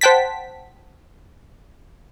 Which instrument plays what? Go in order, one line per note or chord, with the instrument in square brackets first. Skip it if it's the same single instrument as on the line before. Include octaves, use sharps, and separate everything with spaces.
[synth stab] C5 F#5 G5 A5 B6